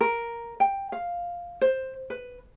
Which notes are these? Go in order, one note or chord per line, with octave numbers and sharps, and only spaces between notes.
A#4
G5
F5
C5
B4